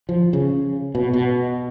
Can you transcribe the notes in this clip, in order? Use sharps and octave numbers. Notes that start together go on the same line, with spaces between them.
F3
C#3
B2
B2